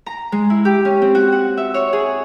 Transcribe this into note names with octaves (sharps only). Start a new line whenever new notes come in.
A#5
G#3
E4
G4
C#4
C4
F#4
F#5
E5
C#5
G#4